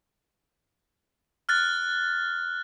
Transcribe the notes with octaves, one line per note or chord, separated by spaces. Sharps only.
F6 F#6 A6